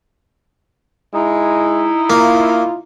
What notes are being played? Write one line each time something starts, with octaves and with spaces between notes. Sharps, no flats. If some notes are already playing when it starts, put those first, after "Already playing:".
G#3 D#4 E4
A#3 F4